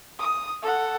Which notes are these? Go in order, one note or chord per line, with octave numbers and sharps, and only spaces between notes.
D#6
A4 F#5